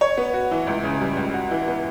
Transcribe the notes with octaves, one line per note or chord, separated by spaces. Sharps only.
C#5
B3
F#4
E3
C#2
C#3
G3
C#2
F#4
E3
B3